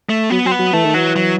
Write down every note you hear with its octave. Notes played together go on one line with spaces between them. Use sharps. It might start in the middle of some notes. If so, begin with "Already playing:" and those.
A3
F#3 B3
F#3 C4
B3
F#3
E3 A3
D#3
E3 F#3
F#3